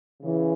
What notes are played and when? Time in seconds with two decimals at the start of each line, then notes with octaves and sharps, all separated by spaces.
0.22 C#3 E3